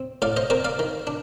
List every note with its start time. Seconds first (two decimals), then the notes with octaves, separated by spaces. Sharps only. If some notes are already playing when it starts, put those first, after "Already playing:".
Already playing: C4
0.22 A2 D5 F5
0.37 C5 D#5
0.50 C4 A#4 D5
0.65 D5 F5
0.79 D#3
1.07 D4